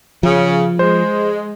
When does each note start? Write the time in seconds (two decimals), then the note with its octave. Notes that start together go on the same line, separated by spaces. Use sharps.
0.23 C#3 F3
0.79 G#3 C5